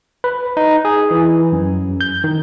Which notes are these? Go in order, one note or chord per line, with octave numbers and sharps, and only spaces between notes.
B4
D#4
G#4
E3
F#2
G6
D#3